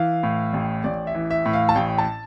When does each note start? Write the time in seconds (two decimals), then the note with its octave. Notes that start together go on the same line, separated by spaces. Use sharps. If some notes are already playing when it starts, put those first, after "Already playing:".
Already playing: E3 F5
0.23 A2
0.53 A1
0.84 A1 D5
1.07 E5
1.14 E3
1.31 E5
1.46 A2
1.53 F5
1.69 A5
1.75 A1 G5
1.98 A5